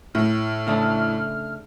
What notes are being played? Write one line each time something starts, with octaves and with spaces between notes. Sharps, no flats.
A2 F6
C#3 A3 D4